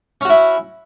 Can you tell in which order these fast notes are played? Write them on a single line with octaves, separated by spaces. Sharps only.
C#4 F#4 E4